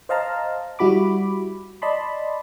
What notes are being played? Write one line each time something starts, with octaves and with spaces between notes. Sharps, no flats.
C5 D#5 F5 A5 A#5
G3 E4 F#4 B5 D6
D5 D#5 A5 B5 C6